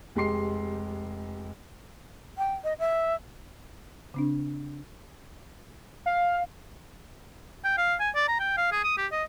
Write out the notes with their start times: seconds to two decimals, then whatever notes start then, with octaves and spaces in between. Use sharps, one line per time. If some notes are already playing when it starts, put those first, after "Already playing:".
0.15 F1 G#3 G4 C6 C7
2.38 G5
2.64 D#5
2.79 E5
4.14 C#3 C4 D4
6.06 F5
7.65 G5
7.78 F5
8.00 G#5
8.15 D5
8.28 A#5
8.40 G5
8.57 F5
8.72 G#4
8.84 D#6
8.98 G4
9.12 D#5